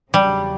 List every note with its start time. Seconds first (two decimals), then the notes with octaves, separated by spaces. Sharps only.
0.14 E2 C#3 F#3 G3